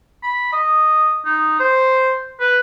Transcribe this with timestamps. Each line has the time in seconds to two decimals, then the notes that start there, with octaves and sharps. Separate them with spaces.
0.23 B5
0.53 D#5
1.25 D#4
1.60 C5
2.40 B4